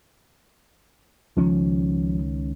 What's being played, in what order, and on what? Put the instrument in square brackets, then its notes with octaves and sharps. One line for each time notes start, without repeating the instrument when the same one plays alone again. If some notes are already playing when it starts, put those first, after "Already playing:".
[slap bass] C#2 D#3 C#4 [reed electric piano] F3